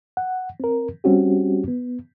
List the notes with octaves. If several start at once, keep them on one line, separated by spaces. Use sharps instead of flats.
F#5
C4 A#4
G3 C4 C#4 F#4 G4
B3